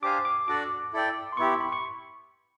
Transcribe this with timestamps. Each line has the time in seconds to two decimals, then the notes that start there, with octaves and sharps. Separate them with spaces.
0.02 D4 G4 C5 F5 G#5 D6
0.25 D6
0.48 D4 F#4 A4 D5 D6
0.93 E4 A4 D5 G5
1.32 C6
1.37 B3 E4 G4 C#6
1.61 B5
1.72 C#6